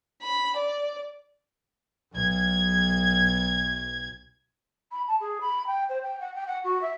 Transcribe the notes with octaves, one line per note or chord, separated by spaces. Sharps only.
B5
D5
B1 G#6
B5
A5
G#4
B5
G5
C5
G5
F#5
G5
F#5
F#4
E5